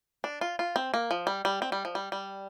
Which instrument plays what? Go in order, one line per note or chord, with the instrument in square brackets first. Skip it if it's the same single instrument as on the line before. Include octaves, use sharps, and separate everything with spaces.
[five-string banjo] D4
F4
F4
C4
A#3
F3
G3
G3
C4
G3
F3
G3
G3